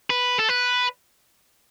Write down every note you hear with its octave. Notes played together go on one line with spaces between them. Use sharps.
B4
A4
B4